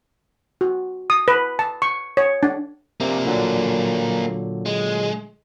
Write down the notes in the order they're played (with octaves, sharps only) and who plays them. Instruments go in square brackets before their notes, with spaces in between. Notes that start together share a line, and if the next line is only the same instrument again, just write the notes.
[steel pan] F#4
D#6
B4
A5
C#6
C#5
D4
[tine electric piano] C3 [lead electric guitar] A#3 D4
[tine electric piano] A#2 D3 F#3
[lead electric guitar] G#3